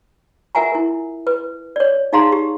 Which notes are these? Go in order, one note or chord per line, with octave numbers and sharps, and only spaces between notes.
F4 A#4 E5 F#5 G#5 A#5
E4 A#4
B4
C#5 D5
D#4 G#4 F5 A#5 C6
G4